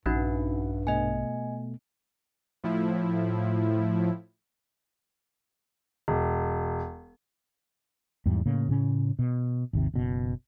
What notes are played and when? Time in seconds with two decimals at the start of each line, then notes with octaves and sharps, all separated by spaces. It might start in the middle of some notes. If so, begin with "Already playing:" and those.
0.06 A#1 G2 C#4 D#4 F#4 E5 F#5
0.87 B2 A3 B3 D#5 G#5
2.64 A2 F3 E4
6.08 E1
8.26 E2 G#2 G3
8.46 A2 C#3 A#3
8.68 A2 C#3 C#4
9.19 B2
9.73 G#1 D#2 C3
9.94 F#1 B2